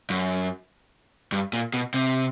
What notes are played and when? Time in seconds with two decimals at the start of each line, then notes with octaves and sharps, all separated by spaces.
0.10 F#2
1.32 G2
1.53 A#2
1.74 B2
1.94 C3